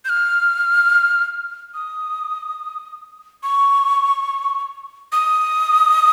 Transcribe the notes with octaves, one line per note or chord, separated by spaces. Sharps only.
G6
F6
D#6
C#6
D#6